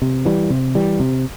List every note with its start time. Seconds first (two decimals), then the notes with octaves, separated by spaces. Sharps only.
0.02 C3
0.25 E3 G3
0.50 C3
0.75 E3 G3
1.00 C3